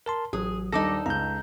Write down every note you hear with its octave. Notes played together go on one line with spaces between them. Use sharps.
A#4 A5 C6
A1 F#3 G#4
D#1 G3 D4 D#4 A4 D6 A#6
C#2 A#5 G6